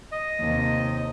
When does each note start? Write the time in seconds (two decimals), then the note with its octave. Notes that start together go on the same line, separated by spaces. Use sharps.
0.12 D#5
0.40 D#2 C3